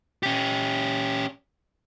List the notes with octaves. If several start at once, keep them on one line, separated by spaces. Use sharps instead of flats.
C#4 G4